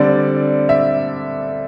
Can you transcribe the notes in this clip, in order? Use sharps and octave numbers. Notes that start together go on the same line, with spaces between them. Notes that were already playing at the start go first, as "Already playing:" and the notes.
Already playing: D3 G3 C4 D5
E5